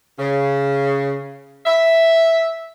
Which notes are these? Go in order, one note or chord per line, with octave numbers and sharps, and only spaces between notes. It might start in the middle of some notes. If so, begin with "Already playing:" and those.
C#3
E5